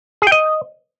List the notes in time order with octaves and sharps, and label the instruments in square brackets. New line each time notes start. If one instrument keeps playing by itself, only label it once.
[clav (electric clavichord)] G#4
G5
D#5